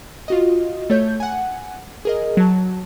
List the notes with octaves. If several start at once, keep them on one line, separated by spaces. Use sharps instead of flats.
F4 F#4 D#5
A3 C#5 G6
F#5 G#5
G#4 A#4 D#5
F#3 A5